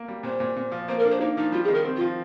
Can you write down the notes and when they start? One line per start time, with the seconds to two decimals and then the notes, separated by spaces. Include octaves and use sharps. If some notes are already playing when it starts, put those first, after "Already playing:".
Already playing: A#3
0.08 G3
0.23 A#2 C5
0.40 A#2
0.56 A#2
0.72 F3
0.88 A#3 C5
0.98 A#4
1.05 D4 C5
1.20 A#3 D#4
1.37 F3 D#4
1.52 G3 F4
1.64 G#4
1.68 D#3
1.74 A#4
1.85 C4
1.96 F4
2.01 F3